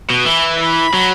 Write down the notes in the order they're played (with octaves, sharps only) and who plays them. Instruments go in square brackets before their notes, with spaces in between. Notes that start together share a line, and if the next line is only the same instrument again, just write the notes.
[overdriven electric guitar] B2
[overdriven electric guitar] E3 [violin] B4
[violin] B5
[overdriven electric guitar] F#3